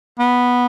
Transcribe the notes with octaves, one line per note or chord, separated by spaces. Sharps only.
B3